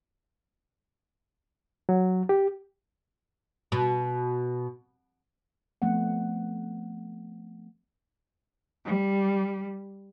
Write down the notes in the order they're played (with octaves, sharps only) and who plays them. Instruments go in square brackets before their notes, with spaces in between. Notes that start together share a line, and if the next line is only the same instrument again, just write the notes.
[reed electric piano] F#3
G4
[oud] B2
[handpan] F3 A3 B3 C4 F#5
[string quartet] G3